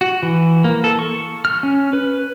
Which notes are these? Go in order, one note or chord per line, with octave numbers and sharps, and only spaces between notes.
F#4
E3
A#3
A4
C#6
F6
C#4
B4